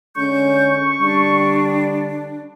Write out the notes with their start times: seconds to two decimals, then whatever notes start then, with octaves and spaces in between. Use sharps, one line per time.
0.16 D3 G#3 C#4 C#6 G6
1.01 D3 G3 D4